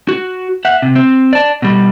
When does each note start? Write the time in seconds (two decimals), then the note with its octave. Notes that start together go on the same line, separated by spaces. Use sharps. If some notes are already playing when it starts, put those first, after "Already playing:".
0.09 F#4
0.65 E5 F#5
0.82 C3
0.95 C4
1.33 D5 A5
1.62 B2 G3